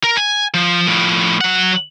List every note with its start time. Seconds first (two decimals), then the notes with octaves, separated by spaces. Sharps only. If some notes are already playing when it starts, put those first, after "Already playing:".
0.04 A#4
0.17 G#5
0.54 F3
0.87 A2 F3
1.41 F#3 F#5